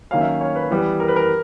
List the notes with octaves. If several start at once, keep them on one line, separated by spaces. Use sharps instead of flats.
D#3 F#3 A#3 C#4 F5
E5
C#5
B4
E3 G3 B3
A#4
B4
A#4